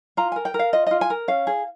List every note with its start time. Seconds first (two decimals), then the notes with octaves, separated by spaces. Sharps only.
0.17 F4 A#5
0.32 A#4 G#5
0.45 G5
0.54 A#4
0.59 F5
0.73 F4 D#5
0.87 F4 D#5
1.01 G#5
1.10 A#4
1.28 C#4 F5
1.47 G#4